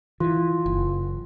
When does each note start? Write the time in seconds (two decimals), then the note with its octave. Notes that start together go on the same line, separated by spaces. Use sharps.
0.20 E3 F4
0.66 F#1